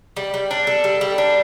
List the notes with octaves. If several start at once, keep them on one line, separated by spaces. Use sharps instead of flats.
G3
G3
D4
A4
G3
G3
D4